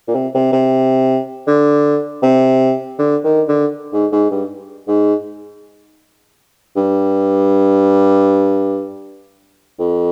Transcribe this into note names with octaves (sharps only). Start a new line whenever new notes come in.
A#2
C3
C3
C3
D3
C3
D3
D#3
D3
G#2
G#2
G2
G#2
G2
F2